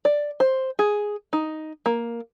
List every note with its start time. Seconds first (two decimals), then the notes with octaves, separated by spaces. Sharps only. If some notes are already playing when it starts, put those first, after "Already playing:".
0.05 D5
0.40 C5
0.79 G#4
1.33 D#4
1.86 A#3